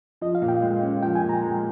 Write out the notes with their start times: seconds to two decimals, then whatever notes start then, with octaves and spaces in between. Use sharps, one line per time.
0.21 F3 D#5
0.35 F5
0.42 A#2
0.48 G5
0.62 G#3
0.82 C#4
1.03 F3 G5
1.15 G#5
1.21 A#2
1.29 A#5
1.42 G#3